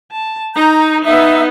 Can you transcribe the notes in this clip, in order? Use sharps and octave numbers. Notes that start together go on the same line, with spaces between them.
A5
D#4 A#5 G6
B3 D#4 E5